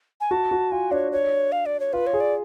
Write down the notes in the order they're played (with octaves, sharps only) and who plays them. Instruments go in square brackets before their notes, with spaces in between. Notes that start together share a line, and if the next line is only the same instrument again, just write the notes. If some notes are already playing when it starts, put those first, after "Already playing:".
[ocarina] G#5
[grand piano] F#4 [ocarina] A5
[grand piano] F#4
[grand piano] F4 [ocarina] G#5
[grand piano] D4 [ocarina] C#5
[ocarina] C#5
F5
D5
C#5
[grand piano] F4 [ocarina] B4
[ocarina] C#5
[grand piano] G#4
[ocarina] D5